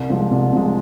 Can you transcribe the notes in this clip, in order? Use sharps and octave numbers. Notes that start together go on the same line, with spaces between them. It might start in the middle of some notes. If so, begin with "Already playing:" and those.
Already playing: C2
C3 F3 G#3
C2
C3 F3 G#3